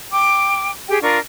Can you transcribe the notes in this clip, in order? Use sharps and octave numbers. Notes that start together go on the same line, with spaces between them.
G5 D6
G4 G#4 G5
D4 F4 A#4 C#6